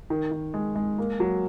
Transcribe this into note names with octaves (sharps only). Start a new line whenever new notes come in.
D#3
D#3
G#3
G#3
A#3
F#3